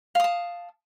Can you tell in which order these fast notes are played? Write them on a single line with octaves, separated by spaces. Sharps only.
F5 D#6 A5